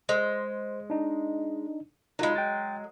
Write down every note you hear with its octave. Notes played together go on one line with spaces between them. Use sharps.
G#3 C5
D4 D#4
F#3 G#3 D#4 F4 B5
G5 A6